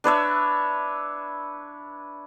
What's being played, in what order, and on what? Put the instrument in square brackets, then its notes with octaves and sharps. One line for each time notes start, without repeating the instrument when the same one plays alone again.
[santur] D4 B4 C#5 E5